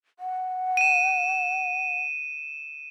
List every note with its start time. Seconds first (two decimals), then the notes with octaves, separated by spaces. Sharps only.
0.19 F#5
0.77 D#7 E7